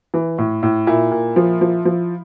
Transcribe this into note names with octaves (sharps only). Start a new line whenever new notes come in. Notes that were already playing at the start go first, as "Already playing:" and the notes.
E3
A2
A2
A#2 E4
A#2
F3
F3
F3